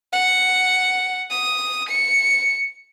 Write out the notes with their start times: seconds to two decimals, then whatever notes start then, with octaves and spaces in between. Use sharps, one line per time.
0.13 F#5
1.31 D#6
1.90 C#7